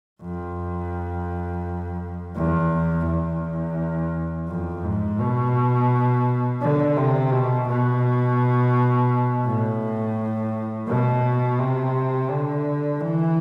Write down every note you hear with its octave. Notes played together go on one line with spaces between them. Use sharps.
F2
E2
E2
F2
G#2
B2
D3
C3
B2
B2
A2
B2
C3
D3
E3